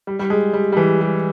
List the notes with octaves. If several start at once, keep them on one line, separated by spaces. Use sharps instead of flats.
G3
G3
G#3
G3
G3
E3
G3